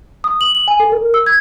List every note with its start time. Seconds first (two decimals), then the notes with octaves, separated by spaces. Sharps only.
0.24 D#6
0.41 F#7
0.55 F#7
0.68 G#5
0.80 A4
0.92 A#4
1.14 E6
1.26 G#6